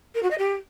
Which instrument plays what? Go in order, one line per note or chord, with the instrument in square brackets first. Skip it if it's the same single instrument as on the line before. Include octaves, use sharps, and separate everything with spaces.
[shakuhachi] A#4
F#4
D#5
G4